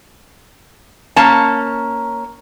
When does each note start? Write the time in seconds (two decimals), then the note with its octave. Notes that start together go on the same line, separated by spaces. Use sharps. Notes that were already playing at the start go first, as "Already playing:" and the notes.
1.16 A#3 C#4 A5